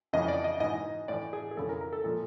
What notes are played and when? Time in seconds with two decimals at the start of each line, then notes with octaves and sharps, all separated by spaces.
0.13 F2 C#3 E3 D#5
0.28 D5
0.44 D#5
0.60 G#2 E3 D#5
1.08 A2 E3 D5
1.33 G#4
1.51 G#4
1.57 F2 C#3 E3 A4
1.69 A#4
1.81 A#4
1.93 A4
2.04 A#2 F3 A4